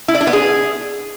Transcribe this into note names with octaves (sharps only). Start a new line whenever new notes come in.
E4
D5
D4
B3
G#4